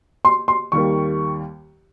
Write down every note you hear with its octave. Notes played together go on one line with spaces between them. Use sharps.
C6
C6
D#2 D#3 G3 A#3 C#6